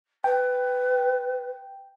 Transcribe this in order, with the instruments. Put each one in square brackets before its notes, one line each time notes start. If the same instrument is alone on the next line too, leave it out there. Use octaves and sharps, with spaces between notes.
[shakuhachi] B4 [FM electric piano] G5